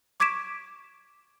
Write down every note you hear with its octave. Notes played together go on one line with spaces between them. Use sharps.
C#6 D6 G#6 B6 D7 E7